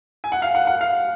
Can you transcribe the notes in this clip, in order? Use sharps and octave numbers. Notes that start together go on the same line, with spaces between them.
G#5
F#5
F5
F#5
F#5
F5